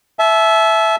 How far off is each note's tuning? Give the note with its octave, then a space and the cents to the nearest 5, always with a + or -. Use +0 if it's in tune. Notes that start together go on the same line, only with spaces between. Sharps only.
E5 +0 A5 -35